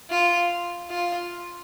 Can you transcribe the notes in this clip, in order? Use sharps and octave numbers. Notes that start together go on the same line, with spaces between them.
F4
F4